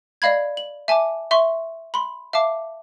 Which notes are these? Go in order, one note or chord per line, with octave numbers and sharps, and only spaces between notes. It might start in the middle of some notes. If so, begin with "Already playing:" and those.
D5 D#5 F5 B5 G#6
F#7
E5 G#5 A5 D6
E5 C6 C#6
B5 C6
E5 F5 A5 D6